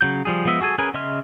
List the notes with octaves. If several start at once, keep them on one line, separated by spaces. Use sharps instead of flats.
C#3 F#3 G6
F3 G3 G#4
F3 G#3 B3 D#5 E5
F#4 G#4 A4 G#5
C#4 G#4 A#4 B4 G#5
C#3 D#5 E5 C6 F6